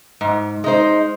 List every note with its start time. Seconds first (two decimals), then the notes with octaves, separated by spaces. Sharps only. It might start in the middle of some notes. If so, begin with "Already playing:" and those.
0.21 G#2
0.64 G#3 D#4 C5